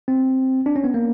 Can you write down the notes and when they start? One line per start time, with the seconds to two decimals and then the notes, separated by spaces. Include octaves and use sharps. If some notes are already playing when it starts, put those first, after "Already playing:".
0.08 C4
0.66 D4
0.76 C#4
0.84 B3
0.94 A#3